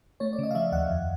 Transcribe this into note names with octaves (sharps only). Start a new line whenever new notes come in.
A3 C#5
D5
C#3 D#5
F5
F3 E5
D#2 F#5
F2